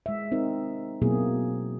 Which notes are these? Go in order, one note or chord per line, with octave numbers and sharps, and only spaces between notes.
G#3 E5
C4 D#4 A#4
B2 F#3 A#3 C4 E4 G#4